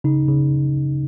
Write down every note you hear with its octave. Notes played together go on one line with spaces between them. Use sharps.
C#3 D#4
C#3